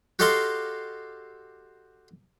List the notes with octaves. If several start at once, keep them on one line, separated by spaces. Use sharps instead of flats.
F#4 G4 A4 D#5 F5 C6